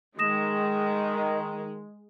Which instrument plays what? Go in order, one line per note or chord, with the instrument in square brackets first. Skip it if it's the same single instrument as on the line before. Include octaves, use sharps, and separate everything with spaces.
[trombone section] D#3 [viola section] G#3 [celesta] D#6 A#6 E7